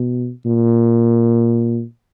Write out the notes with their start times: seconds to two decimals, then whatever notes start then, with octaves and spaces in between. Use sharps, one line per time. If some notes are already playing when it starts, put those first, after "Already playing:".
Already playing: B2
0.46 A#2